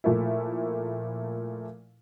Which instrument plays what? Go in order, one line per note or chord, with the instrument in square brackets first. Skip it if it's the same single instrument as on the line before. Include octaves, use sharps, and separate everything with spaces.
[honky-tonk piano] A#2 F3 A3 A#3 E4